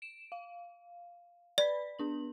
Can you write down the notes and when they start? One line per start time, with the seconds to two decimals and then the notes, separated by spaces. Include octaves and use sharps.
0.02 D7 E7
0.32 F5
1.58 B4 D5 B5 B6
1.99 B3 D4 F#7